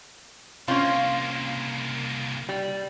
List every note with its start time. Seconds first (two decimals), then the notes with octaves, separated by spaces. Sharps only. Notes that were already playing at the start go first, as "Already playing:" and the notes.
0.68 C2 A#3 C4 C#4 F4
2.49 G3